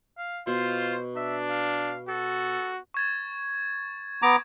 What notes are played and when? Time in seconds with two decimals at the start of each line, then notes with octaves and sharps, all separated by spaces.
0.18 F5
0.47 B2 F4 C5
1.16 D4 E5
1.50 F5
2.09 F#4 A4
2.94 C#6 G#6 A6
4.22 B3 A#5 D6